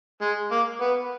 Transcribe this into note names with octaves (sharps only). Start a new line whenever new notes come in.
G#3
A#3
B3